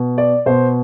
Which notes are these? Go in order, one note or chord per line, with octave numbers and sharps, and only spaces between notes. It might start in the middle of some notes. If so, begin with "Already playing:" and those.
Already playing: B2
D5
B2 C5